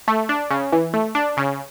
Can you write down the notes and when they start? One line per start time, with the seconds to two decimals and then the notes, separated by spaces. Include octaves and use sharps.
0.08 A3
0.29 D4
0.51 C#3
0.72 E3
0.94 A3
1.15 D4
1.37 C#3